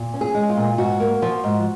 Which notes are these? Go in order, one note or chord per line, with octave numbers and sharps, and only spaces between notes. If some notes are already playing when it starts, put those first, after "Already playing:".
Already playing: A#2
C#4
G#4
G#3
F4
A#2
G#2 F#4
A#3
F3
G#2